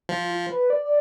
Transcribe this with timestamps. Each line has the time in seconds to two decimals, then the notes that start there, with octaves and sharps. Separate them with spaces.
0.09 F3 F4
0.50 B4
0.70 D5
0.85 D5